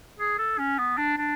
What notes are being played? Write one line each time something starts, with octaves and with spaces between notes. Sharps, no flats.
G#4
A4
C#4
B3
D4
D4